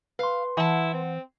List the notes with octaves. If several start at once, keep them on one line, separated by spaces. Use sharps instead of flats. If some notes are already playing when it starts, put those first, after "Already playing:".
B4 F5 C6
E3 E4 F#5 A5
C4